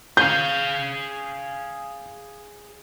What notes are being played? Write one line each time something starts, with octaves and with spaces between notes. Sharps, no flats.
G#4 F5 G6